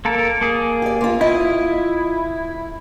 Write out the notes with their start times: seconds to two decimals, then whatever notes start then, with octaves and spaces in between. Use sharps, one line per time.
0.05 A#3 A4 A#4
0.41 A#3 G#4
0.82 G4 D5
1.01 A#3 F4
1.21 E4 F4 D#5